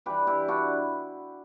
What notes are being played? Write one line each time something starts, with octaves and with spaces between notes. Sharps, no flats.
G2 E3 G3 G4 B4
E4 G4
D4 F#4